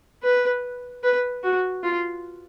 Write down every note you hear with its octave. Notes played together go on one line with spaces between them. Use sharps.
B4
B4
F#4
F4